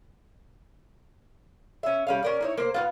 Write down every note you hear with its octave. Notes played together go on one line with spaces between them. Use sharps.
C#4 E5
G3 C#4 F5
C#4 A#4 D5
D#4 E4 C#5
A#3 C5
B3 C4 F4